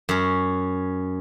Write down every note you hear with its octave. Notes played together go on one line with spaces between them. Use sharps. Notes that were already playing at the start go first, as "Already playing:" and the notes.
F#2 C#4